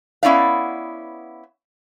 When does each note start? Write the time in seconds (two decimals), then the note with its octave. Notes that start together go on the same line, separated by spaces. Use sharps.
0.23 B3 C#4 E4 D5 F5